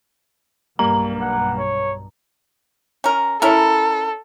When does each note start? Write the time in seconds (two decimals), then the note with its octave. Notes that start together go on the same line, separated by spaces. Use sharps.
0.79 B1 G2 G3 A#3 A#5
1.21 F#5
1.58 C#5
3.04 C#4 A#4
3.42 C#4 E4 A4 A#4